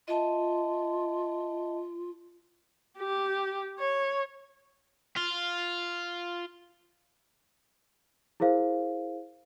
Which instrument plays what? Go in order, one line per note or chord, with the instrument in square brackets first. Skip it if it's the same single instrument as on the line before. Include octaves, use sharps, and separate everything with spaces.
[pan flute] F4 [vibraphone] D#5 E5 A5
[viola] G4
C#5
[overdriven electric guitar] F4
[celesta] E4 G#4 A#4 C5 F5